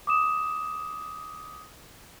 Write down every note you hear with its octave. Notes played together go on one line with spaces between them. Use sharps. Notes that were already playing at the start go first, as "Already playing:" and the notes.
D6 D#6 E7